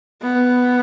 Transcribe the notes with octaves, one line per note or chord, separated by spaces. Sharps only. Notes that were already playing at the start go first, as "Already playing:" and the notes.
B3